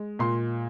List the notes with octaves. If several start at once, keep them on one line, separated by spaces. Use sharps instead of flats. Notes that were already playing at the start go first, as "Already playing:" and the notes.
Already playing: G#3
A#2 C6